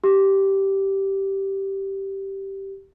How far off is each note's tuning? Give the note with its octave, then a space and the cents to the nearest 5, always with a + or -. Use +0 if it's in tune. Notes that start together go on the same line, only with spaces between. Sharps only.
G4 -10